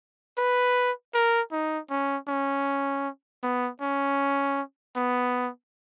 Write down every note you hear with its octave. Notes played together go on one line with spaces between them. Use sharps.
B4
A#4
D#4
C#4
C#4
B3
C#4
B3